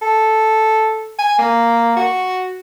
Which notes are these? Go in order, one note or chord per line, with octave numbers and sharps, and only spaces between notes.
A4
G#5
A#3
F#4